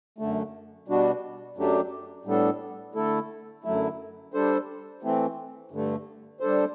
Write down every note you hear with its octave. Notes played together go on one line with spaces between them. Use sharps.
F#2 D3 A3
B2 G3 D4 F#4
F#2 F#3 A3 D4 G4
A2 G3 B3 D4 A4
D3 A3 E4 A4
F#2 D3 F#3 A3 E4
G3 D4 A4 C5
E3 A3 C4
G2 D3 A3
G3 D4 A4 C5